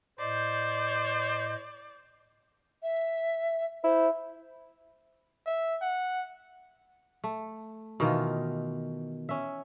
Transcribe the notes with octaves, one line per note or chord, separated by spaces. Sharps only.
A2 C5 D5 D#5 G6
E5
E4 C5
E5
F#5
A3
B2 D#3 E3 F4
C#4 E5